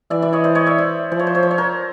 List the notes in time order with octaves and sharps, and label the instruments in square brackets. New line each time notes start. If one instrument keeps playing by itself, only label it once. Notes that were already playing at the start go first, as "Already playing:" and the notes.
[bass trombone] E3 [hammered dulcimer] D5 E5
[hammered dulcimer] D5 E5
C#5 D#5
C5 D5
C#5 D#5
D5 E5
C5 D5
[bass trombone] F3 [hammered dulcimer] C5
[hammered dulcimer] C#5
C5
C#5
C5
C#5
A#4 C5